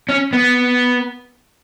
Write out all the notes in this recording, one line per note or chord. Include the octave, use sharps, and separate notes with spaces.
C#4
B3